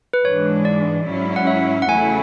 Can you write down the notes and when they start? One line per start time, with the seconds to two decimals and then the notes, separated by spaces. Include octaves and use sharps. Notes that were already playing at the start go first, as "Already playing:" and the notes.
0.14 B4
0.25 G#2 E3 G#3 D4 C#5
0.65 D5
1.06 G#2 F#3 C#4 E4
1.36 F#5
1.47 E5
1.82 F#5
1.88 E2 C#3 F#3 A3 E4 G#5